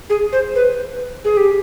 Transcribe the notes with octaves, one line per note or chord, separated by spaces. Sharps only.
G#4
C5
B4
G#4
G4